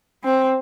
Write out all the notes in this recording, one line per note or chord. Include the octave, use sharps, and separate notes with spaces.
C4